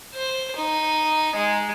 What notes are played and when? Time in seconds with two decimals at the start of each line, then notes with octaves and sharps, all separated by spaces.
0.15 C5
0.56 D#4
1.36 G#3